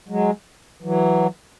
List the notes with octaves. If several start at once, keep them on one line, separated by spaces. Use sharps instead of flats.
F#3 G#3
E3 F#3